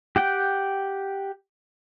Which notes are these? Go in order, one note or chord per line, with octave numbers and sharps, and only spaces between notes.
G4 F#5 G5